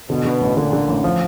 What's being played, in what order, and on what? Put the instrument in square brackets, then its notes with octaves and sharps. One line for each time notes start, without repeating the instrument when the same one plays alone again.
[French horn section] B2 [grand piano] D3
[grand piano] D3
A1
[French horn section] A#2 [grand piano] D3
[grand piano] D3
A1
F3